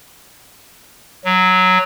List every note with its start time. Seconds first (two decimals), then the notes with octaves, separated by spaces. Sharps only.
1.25 F#3